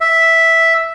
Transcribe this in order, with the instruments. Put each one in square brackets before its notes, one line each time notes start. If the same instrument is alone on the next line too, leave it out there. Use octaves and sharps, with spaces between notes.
[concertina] E5